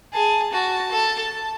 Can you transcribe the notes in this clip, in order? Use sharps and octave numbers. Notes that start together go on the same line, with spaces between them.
G#4 A5
F#4 A5
A4